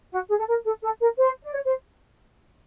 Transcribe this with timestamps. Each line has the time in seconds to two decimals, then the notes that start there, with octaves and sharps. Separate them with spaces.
0.11 F#4
0.29 G#4
0.38 A4
0.46 A#4
0.64 A4
0.82 A4
1.00 A#4
1.18 C5
1.42 D5
1.53 C#5
1.65 C5